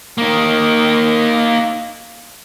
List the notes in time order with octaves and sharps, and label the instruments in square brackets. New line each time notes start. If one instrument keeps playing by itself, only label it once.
[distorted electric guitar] A#3 D#4